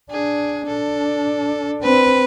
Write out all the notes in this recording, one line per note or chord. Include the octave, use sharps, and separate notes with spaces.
D4 G#4
D4 A4
C4 B4